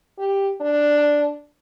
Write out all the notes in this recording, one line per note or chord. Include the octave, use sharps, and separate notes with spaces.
G4
D4